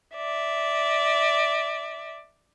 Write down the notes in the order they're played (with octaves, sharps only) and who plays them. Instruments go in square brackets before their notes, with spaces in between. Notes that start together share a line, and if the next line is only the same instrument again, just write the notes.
[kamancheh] D5 E5